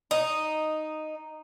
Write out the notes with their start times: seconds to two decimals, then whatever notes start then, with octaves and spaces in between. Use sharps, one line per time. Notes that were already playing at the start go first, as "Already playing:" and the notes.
0.11 D#4